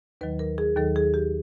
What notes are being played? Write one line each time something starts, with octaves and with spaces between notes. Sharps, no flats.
D#2 D#3 F#3 B4
A#4
G#4
D#2 D#3 F#3 A4
G#4
G4